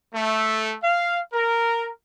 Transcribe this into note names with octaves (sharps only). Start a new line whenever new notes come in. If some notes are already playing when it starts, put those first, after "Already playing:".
A3
F5
A#4